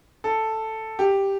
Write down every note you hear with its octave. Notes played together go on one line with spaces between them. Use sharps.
A4
G4